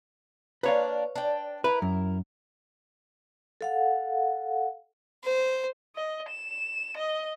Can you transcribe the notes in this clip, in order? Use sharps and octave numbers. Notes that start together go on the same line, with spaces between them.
A#3 D4 B4 C#5 F5
D4 G5
E4 A#4 B4
F#2
A4 F5 F#5
C5
D#5
E7
D#5